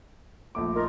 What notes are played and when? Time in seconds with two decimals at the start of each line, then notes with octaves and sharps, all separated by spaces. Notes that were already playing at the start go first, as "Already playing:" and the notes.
0.55 A#1 A3 D6
0.75 D#4 F4 A#4